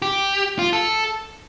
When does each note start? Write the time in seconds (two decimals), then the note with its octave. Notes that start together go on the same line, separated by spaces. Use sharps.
0.02 G4
0.59 F4
0.73 A4